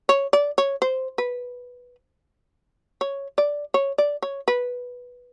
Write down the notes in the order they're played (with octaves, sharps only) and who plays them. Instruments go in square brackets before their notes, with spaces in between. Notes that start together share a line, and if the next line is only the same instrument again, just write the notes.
[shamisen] C#5
D5
C#5
C5
B4
C#5
D5
C#5
D5
C#5
B4